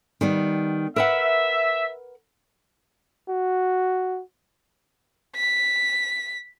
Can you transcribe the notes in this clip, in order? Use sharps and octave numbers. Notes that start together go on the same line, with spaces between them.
D#3 G3 B3
A#4 B4 E5 F#5
F#4
B6